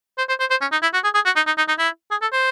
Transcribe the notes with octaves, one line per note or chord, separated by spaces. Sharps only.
C5
C5
C5
C5
C#4
D#4
E4
F#4
G#4
G#4
F#4
D#4
D#4
D#4
D#4
E4
G#4
A4
C5